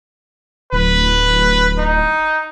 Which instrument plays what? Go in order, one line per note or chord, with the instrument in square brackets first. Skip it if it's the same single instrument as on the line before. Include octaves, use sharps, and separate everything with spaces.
[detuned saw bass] D1 [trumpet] B4
[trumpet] D#4